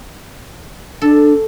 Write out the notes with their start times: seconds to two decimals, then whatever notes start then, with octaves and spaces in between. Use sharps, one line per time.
1.02 D4 A4